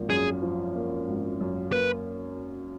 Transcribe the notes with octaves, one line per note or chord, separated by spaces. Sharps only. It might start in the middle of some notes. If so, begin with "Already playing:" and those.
Already playing: G#1 F3 A#3
F#2 G#4
F3
A#3
G#1
F#2
A#3 B4